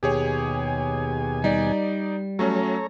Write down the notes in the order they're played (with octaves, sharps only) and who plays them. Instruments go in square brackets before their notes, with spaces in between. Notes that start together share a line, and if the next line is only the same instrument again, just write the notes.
[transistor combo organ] D#2 B2 G#5 [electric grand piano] G4 G#4 C#5
[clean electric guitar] G3 [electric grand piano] D#4 D5
[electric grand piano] F#3 A3 C#4 [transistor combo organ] A4 C#5 A#5